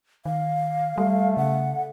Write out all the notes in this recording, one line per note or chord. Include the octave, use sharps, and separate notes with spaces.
D#3 F5
G3 A3
C#3 F#5